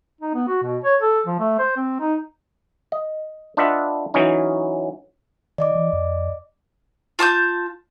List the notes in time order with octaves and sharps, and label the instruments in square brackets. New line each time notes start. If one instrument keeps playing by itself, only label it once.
[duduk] D#4
B3
F#4
B2
C#5
A4
F3
A3
C5
C4
D#4
[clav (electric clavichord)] D#5
D4 F4 B4 D#5 E5 F#5
E3 F#3 C#4 D#4
[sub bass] D#3 [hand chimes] D5 D#5 D6
[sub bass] E3
F2
[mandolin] F4 A5 C#6 G6